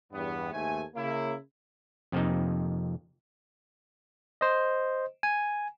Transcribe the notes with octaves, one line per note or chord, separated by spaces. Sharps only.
E2 G2 B3
D#2 G#2 A3 G#5
C#3 A#3 E4
F2 C3 F3 A#3 D#4
C5 D#5
G#5